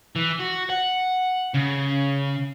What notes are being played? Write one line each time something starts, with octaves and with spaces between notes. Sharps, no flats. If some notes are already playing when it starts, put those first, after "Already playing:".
E3
F#4
F#5
C#3